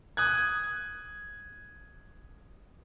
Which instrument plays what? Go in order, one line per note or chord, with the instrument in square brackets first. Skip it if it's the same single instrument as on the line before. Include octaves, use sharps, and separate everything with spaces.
[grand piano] D#6 F#6 G#6